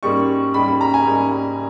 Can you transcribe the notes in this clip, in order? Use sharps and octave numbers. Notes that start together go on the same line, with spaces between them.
G#2 G3 A#3 C#4 C#6
G#2 G3 A#3 C#4 B5
B5
A#5
G#5
G#2 G3 A#3 C#4